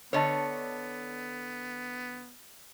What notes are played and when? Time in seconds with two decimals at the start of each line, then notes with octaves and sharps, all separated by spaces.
0.13 D3 B3 B4 C#5 D#5 A5